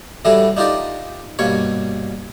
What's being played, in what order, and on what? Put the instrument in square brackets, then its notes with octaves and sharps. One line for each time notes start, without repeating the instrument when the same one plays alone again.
[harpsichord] A2 E3 F#3 G3 A3 F#4
D4 D#4 F4 G4 A#4 D5
G2 B2 A#3 C#5 C#6